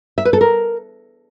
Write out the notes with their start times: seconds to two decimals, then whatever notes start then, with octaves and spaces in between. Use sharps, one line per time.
0.18 E5
0.25 B4
0.33 A4
0.41 A#4